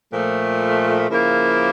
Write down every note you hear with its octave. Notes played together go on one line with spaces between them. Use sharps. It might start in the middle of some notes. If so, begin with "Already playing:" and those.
A#2 F3 A3
C#3 F3 A#3 E4